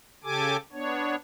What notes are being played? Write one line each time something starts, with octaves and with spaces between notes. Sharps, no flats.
C#3 G4 A4 G#5 D6
B3 D4 C#5